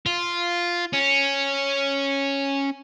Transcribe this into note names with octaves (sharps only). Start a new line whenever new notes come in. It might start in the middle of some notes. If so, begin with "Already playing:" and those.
F4
C#4